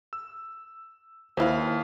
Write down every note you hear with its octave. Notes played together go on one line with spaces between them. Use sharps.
E6
D#2 E4 B4 C5 F5